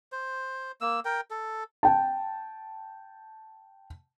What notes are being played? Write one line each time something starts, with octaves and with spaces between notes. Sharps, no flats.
C5
A#3 E6
A#4 G5
A4
G5 A5